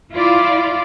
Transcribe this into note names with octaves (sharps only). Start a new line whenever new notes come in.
E4 F4 D5